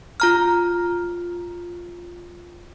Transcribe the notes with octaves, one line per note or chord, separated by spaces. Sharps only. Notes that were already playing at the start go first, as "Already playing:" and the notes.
F4 A#5 F6